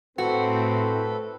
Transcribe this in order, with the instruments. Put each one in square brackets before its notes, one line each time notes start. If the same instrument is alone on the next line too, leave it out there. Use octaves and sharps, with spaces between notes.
[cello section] A2 [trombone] C4 [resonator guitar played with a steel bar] F#4 [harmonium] A4 B4